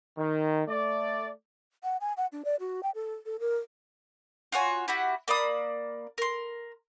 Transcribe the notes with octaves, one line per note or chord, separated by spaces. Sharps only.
D#3
A3 D5
F#5
G#5
F#5
D4
D5
F#4
G5
A4
A4
A#4
F4 F#4 C#5 G#5
E4 F#4 G4 F#5
A#3 D5 B5 D#6
A#4 C6